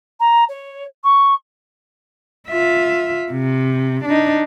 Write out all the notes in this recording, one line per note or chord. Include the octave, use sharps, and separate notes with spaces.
A#5
C#5
C#6
F4 E5
C3
D4 D#4